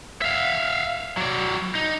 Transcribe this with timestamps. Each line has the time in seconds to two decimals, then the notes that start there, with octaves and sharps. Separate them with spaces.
0.22 E5 F5
1.17 F#3 D5
1.75 D#4